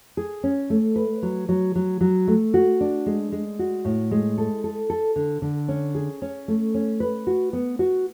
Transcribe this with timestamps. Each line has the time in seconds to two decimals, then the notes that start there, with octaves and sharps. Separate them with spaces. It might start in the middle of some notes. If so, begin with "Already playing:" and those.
0.17 G#4
0.43 C#4
0.70 A3
0.96 B4
1.22 F#3
1.49 F#3
1.75 F#3
2.01 F#3
2.27 A3
2.54 F#4
2.81 D4
3.06 G#3
3.32 G#3
3.59 F#4
3.85 A2
4.11 G#3
4.38 A4
4.64 A4
4.90 A4
5.16 D3
5.42 D3
5.68 C#4
5.95 G#4
6.22 C#4
6.48 A3
6.74 C#4
7.00 B4
7.27 F#4
7.53 B3
7.79 F#4